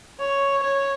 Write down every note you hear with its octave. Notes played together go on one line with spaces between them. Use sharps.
C#5
C#5